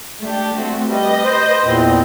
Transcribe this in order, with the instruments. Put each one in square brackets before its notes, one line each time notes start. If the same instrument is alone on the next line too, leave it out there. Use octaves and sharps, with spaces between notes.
[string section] A3 D4 G4
A3 C4 F#4
[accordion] G3 [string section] B4 D#5
[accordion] C5
E2 A#2 C4